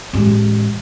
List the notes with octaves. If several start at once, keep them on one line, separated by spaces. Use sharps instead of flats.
A1 G#3